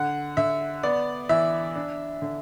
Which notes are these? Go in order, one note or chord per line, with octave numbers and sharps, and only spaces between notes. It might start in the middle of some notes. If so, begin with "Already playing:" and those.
Already playing: D3 F#5
D3 E5
B3 D5
E3 E5
D4
D3